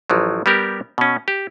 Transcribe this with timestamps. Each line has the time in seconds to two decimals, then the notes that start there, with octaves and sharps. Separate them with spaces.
0.10 A1 F3 F#3
0.46 G3 B3 G4 A#4
0.98 B2 C#4
1.28 G4